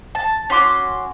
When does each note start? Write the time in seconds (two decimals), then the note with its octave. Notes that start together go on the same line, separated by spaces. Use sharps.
0.15 A5
0.50 C#4 F#4 C6 D6